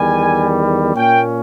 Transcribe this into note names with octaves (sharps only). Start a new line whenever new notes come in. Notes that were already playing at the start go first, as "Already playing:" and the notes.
Already playing: E2 D#3 G3 G#5
A#2 A#3 C#4 G5